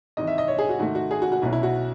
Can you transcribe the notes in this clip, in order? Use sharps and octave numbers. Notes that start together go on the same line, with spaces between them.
G#1 G#2 E3 D#5
E5
D#5
C#5
G#4
F#4
G#2 D#3 A3 F#4
F#4
G#4
F#4
F#4
B1 B2 F#3 C#4 E4
E4
F#4